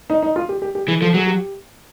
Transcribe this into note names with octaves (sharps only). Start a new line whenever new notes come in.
D#4
D#4
F4
G4
G4
G4
E3 G#4
F3 A4
F#3 G#4
G4